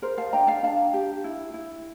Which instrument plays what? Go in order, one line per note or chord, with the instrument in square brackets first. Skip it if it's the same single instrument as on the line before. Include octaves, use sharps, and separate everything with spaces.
[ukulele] A#4 C5
F5 A5
D4 G5 A#5
F5 A5
D4 F5 A5
G4
E4
E4